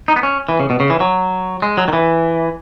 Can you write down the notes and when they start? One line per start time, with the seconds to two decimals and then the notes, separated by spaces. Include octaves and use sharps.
0.08 D#4
0.16 B3
0.23 C#4
0.49 E3
0.60 C#3
0.70 B2
0.80 C#3
0.90 E3
1.00 F#3
1.62 G#3
1.77 F#3
1.88 D#3
1.93 E3